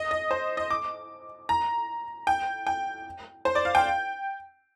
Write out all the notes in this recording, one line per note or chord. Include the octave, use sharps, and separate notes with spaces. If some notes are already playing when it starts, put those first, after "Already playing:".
Already playing: D#5
D#5
C5
D#5
D6
A#5
G5
G5
C5
D5
F5
G5